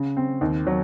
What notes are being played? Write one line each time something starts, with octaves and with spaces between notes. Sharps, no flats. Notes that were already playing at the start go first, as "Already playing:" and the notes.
Already playing: C#3
C4
D#2
F#3